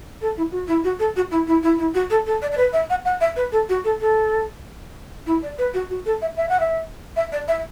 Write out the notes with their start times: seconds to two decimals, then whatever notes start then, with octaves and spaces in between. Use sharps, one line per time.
0.21 A4
0.37 E4
0.52 F#4
0.68 E4
0.84 F#4
0.99 A4
1.16 F#4
1.31 E4
1.47 E4
1.63 E4
1.79 E4
1.94 F#4
2.10 A4
2.26 A4
2.42 D5
2.52 D5
2.57 B4
2.73 E5
2.90 F#5
3.05 F#5
3.21 E5
3.36 B4
3.52 A4
3.69 F#4
3.84 A4
4.01 A4
5.26 E4
5.42 D5
5.58 B4
5.74 F#4
5.90 F#4
6.06 A4
6.22 E5
6.37 E5
6.49 F#5
6.60 E5
7.16 E5
7.32 D5
7.48 E5